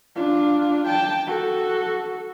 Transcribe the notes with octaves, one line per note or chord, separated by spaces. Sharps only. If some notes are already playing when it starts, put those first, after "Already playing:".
D4 F4
G5 A5
F#4 A4